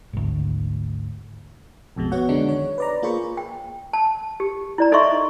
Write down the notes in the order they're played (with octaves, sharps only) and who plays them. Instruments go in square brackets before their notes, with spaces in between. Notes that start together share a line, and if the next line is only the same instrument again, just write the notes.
[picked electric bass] G#1 D2
[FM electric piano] A#1 F2 B2 G#3
B3 F#4 C#5 F#5
D3 D#3 G#3 D4 D#4
C#5
B4 D5 A#5
A#3 F4 G#4 C5 B5 C#6
[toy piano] G5
A5
G4
E4 D5 A#5
D#4 A4 D#5 E5 C6 C#6